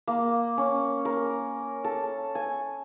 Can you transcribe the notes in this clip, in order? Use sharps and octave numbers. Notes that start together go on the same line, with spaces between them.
A#3
C#4
A#4
A4
G#5